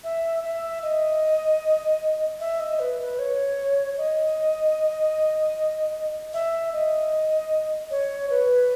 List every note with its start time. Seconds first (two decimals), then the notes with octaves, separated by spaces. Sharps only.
0.04 E5
0.44 E5
0.83 D#5
2.40 E5
2.60 D#5
2.79 B4
3.00 B4
3.19 C#5
3.98 D#5
6.34 E5
6.73 D#5
7.91 C#5
8.30 B4